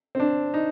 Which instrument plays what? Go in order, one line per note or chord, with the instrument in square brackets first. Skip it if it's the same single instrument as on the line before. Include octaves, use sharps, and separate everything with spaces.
[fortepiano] C4
D4
D#4